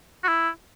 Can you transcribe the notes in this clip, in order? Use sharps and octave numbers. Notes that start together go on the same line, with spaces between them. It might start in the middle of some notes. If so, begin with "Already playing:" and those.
F#4
E4